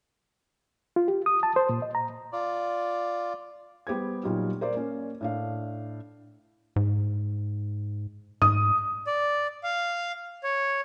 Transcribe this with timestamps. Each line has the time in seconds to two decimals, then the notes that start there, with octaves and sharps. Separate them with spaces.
0.96 F4
1.08 G4
1.26 D#6
1.43 A5
1.56 C5
1.69 A#2
1.82 D#5
1.95 A#5
2.33 F4 D5
3.87 G3 B3 G4 C5 G#6
4.23 A#2 F#3 G3 D#4 F4
4.61 A#4 C5 D5
4.74 A#3 C#4
5.21 A2 D4 F5
6.76 G#2
8.42 G#2 D#6
9.07 D5
9.63 F5
10.44 C#5